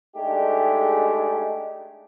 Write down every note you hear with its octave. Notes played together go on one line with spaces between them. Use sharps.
G#3 A3 D4 D#4 G4 G#4